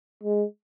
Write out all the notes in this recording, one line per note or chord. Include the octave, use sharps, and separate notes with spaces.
G#3